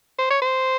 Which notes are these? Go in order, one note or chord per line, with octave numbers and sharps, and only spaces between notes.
C5
C#5
C5